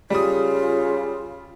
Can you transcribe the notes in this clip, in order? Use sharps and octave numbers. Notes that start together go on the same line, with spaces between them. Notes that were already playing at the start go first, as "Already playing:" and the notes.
C#3 G3 F4 D#6